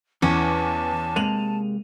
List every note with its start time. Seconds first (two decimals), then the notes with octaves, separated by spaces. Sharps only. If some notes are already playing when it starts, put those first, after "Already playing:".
0.22 E2 E3 C#4 A5
1.16 C3 G#3 A#3 D#7 F7 F#7